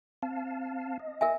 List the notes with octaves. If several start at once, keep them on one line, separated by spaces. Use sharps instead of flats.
C4 F5 A5
D#5
A#4 E5 G#5